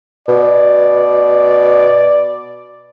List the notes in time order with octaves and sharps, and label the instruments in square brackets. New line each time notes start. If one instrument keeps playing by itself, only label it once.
[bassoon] B2 [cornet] D5